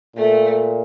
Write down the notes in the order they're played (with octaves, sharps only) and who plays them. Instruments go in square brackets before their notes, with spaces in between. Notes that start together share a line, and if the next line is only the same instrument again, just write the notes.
[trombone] A#2 [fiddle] A3